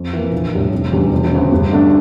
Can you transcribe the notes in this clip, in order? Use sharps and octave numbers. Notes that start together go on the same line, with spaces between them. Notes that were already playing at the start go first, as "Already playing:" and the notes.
Already playing: F2
E3 A#3
A#1
A2 G3 D4
F1
E2 D3 G3 C#4
E1
D2 C#3
G2
D3 A3 D4